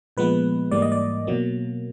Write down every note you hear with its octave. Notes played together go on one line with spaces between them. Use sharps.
A#2 F3 G#3 B3 B4
G#2 E3 G3 A#3 D5
D#5
D5
B2 F#3 A#3